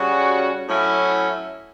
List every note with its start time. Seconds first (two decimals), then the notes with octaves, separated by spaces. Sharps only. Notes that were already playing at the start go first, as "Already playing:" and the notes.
Already playing: C#3 G3 C#4 F#4
0.67 A2 F#3 C#4 E4